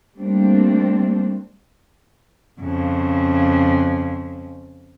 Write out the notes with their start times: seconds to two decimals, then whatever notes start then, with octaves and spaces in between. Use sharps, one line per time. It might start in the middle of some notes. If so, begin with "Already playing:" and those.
0.17 G3 A3 A#3 C4 D4
2.60 F2 C#3